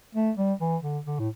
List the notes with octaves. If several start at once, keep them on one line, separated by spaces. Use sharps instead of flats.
A3
G3
E3
D3
D3
A2